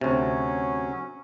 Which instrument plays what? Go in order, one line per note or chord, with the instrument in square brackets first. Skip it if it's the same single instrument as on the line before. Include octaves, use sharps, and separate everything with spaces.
[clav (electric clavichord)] D2 C3 [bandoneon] F#3 C#4